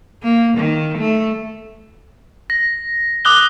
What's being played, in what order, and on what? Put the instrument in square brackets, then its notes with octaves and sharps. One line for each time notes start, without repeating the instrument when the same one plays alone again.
[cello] A#3
D#3
A3
[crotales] A#6
D6 D#6 F#6 G7